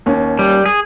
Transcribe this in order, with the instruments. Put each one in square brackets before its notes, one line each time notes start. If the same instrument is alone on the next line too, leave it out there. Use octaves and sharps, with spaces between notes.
[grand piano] D#2 C#4
[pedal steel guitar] G3
G#4